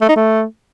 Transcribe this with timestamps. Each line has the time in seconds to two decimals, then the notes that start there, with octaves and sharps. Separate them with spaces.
0.01 A3
0.09 D#4
0.16 A3